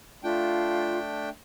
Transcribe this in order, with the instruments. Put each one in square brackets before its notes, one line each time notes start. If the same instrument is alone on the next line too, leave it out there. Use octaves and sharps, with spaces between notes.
[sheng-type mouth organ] A3 D4 G5 [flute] F4